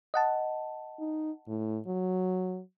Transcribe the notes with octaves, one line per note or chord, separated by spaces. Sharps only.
D#5 F#5 A5
D#4
A2
F#3